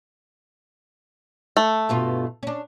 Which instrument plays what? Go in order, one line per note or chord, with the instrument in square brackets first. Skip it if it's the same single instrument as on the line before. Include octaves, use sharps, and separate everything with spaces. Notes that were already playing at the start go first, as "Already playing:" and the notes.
[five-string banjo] A3
[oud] G2 B2 F4
C#4 D4